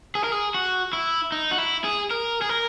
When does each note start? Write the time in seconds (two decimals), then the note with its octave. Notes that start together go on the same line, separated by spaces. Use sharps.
0.15 G#4
0.24 A#4
0.32 G#4
0.54 F#4
0.93 E4
1.32 D#4
1.51 F#4
1.58 E4
1.84 G#4
2.11 A#4
2.42 G#4
2.49 A#4